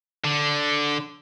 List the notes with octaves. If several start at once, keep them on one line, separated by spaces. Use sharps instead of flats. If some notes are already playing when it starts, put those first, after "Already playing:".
D3